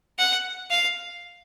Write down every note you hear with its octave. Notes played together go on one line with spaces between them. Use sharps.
F#5
F5